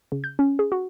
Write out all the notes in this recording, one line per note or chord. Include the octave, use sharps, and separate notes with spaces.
C#3
G6
C#4
G#4
F#4